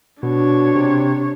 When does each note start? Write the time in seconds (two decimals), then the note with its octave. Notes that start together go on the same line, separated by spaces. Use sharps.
0.23 B2 D4 C#5
0.75 C3